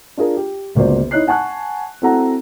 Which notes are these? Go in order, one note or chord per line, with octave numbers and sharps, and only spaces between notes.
D4 F4 G#4 A#4
G4
G1 C#2 A#3 F#4 C5 D5
D#4 E4 C#5 F#6 C7
F#5 G#5 A5 C#6 F#6
C4 E4 F#4 A4 F#5 A#5